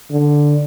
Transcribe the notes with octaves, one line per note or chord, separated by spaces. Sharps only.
D3